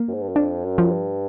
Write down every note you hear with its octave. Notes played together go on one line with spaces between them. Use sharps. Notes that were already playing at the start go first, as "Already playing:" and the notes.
Already playing: A#3
F#2
G#2
G2
F#2
F2 D4
F#2
F3
G2